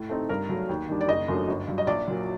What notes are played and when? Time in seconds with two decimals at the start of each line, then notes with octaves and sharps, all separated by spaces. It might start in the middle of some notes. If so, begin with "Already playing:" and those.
Already playing: A2
0.09 A3 C4 D#4
0.29 G2 A#4
0.49 F#3 A3
0.69 D#2
0.88 D#3 G3 D4
1.01 D5
1.08 F#1 D#5
1.28 F#2 F#3 A3 D4
1.48 G1
1.68 G2 F#3
1.78 D#5
1.87 A#1 D5
2.08 A#2 F#3